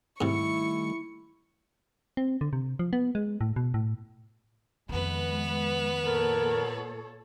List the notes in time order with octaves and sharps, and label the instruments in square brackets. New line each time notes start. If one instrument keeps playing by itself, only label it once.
[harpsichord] G#2 C3 [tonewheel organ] D#3 G3 A3 [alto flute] E4 [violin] C#6 C#7
[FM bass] C4
D3
C3
F3
B3
G#3
A2
B2
A2
[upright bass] F2 D#3 [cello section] G#3 [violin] B3 B4
[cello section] A#2 A4 C#5 [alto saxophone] A#4